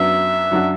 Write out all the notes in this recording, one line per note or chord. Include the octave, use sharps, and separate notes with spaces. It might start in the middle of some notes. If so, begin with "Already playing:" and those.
Already playing: F#2 F#3 B3 D4 E5
F#2 F#3 D4 F#4